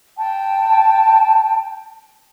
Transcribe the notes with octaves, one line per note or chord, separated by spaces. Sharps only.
G5 A5